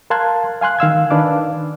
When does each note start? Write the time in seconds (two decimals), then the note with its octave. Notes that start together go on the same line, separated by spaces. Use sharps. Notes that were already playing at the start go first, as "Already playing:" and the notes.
0.10 A#4 F5 A5 C6 F#6 G#6
0.61 F5 G#5 C6 F#6
0.79 D#3 F5 E6 G#6
1.11 D#3 D4 B4 D5 F5 D6